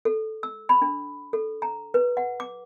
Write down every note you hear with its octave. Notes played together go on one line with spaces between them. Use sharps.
A4
E6
B5
D4
A4
A#5
B4
F#5
D6